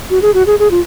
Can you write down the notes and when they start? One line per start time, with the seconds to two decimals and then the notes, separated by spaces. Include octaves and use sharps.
0.10 F#4
0.22 G#4
0.34 F#4
0.47 G#4
0.59 G#4
0.71 F4